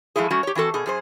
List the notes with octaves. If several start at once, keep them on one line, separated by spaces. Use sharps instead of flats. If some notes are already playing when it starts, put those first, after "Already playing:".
F3 G#3 A3 E4 G#4
G3 A3 C#4 F#4
G4 C#5
E3 C4 F#4 A4
B2 G#4
F#2 G#4 C5